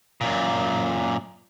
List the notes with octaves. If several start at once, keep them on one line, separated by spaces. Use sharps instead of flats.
F#2 A#2